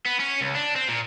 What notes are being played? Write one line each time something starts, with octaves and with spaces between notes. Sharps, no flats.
B3
C#4
C#2
D4
C4
A#2